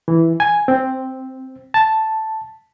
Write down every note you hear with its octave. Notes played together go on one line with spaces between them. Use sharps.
E3
G#5
C4
A5